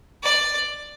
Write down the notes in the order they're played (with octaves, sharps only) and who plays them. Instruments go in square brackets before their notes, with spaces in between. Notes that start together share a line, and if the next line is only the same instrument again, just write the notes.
[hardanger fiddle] D5